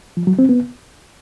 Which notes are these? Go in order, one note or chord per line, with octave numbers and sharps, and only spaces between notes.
F3
F#3
C4
B3